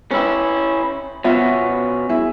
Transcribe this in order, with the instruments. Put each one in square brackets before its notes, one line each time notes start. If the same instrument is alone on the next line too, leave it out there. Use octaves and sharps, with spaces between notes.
[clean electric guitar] C#4 E4 [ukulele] G4 B4
[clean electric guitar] B2 C#4 [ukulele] F4 F#4 E5
[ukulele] E4 G#4